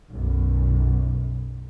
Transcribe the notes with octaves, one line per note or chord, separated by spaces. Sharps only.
B1 F#2